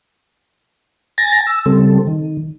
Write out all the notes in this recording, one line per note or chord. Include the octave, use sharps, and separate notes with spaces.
G#5 A6 A#6
E6
C#3 G3 C4 A4
D#3